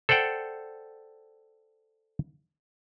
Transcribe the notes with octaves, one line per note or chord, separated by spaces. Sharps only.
A4 C5 D5 F#5 G5